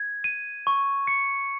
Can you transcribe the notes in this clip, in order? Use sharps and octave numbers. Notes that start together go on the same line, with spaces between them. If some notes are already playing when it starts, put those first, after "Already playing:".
Already playing: G#6
D#7
C#6
C#7